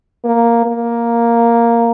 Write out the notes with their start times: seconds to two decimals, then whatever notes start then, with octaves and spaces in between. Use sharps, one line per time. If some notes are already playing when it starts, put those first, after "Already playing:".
0.25 A#3
0.66 A#3